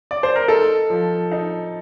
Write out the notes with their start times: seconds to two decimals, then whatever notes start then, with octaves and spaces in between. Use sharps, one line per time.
0.11 D5
0.23 C5
0.36 A#4
0.48 D#4 A4
0.90 F3
1.32 D#4